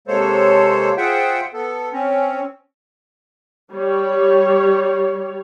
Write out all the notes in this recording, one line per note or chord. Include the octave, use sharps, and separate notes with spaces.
C3 G#3 A#3 A4 C5 C#5
F4 G#4 C5 E5 F#5 G5
B3 A4
C4 C#4
G3 C#5